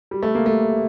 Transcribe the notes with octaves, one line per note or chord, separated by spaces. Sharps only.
G3
A3
A#3
A3